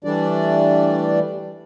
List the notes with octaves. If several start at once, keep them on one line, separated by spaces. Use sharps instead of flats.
E3 G3 A3 D4 D5